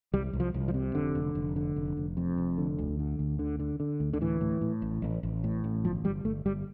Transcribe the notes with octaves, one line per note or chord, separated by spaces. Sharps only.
C2 G3
C2
F3
C2
F3
C3
F1 D3
F1
F1
D3
F1
F1
F2
F1
D3
D2
D3
D2
D3
D3
D3
D2
D3
A2 E3
A2
A2
A1
A1
A1
A2
A1
G1 F3
G1 G3
G1 A3
G1 G3